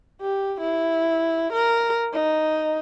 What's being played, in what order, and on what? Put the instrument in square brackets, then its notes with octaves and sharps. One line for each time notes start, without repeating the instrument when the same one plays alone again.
[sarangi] G4
E4
A#4
D#4